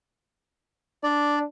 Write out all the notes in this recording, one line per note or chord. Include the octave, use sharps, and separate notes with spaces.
D4 D5